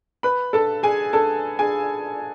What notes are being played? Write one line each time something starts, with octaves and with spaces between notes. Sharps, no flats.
B4 B5
A4 A5
G#4 G#5
A4 A5
G#4 G#5